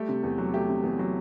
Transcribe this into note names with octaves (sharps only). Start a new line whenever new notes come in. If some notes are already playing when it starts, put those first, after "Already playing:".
Already playing: G3 A3 G4
C3
E2
F#3
A3 G4
C3
E2
F#3